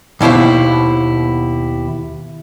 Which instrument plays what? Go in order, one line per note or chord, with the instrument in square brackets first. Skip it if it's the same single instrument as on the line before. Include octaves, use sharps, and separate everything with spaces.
[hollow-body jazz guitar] D#2 B2 E4 C5 F5